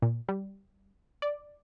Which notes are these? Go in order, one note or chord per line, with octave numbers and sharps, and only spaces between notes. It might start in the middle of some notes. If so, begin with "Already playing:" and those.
A#2
G3
D5